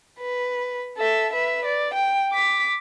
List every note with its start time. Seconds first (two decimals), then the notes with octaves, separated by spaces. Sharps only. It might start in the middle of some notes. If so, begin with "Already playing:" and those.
0.19 B4
0.97 A4 E5
1.33 B4 E5
1.65 D5
1.94 G5
2.32 D6 B6